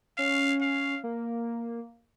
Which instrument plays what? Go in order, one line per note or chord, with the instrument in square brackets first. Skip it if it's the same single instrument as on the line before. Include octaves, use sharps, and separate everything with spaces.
[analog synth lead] C#4 [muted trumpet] F5
[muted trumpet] F5
[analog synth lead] A#3